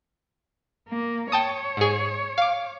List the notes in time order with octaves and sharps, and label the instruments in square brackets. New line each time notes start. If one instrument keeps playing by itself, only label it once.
[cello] A#3
[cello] C#5 [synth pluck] G5 A5 D#6
[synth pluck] G#2 G#4
F5 D6